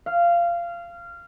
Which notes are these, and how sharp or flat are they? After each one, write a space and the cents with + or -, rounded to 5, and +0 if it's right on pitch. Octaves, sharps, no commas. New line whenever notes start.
F5 -20